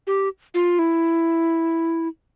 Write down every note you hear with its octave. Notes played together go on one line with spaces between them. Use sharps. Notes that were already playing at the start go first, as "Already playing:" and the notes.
G4
F4
E4